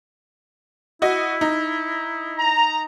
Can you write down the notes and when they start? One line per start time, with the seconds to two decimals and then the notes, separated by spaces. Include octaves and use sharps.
1.02 E4 F#4 D#5
1.41 D#4
2.38 A#5